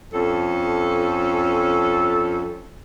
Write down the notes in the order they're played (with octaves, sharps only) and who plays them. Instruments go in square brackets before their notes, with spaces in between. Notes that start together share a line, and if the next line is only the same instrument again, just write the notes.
[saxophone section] F2 C#4 A4